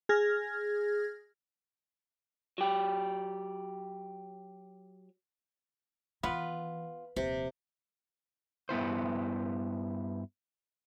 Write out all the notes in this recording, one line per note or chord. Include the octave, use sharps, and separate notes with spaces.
G#4 F6 G#6 A#6
F#3 G4
D#3 E3 B3 F4 B4
D#1 C3 F3
G2 B3 E4 C5